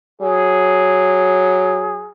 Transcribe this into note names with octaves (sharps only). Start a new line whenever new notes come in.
F#3 G#4